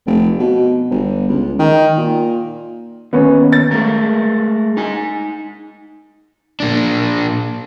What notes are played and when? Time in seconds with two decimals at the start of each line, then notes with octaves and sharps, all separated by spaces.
0.07 F1
0.39 B2
0.90 G1
1.29 C#2
1.59 D#3
1.97 A#2
3.13 D#2 B3 C#4
3.52 A6
3.71 G#3 A3 A#4
4.77 D#4 G#5
6.60 A#2 D4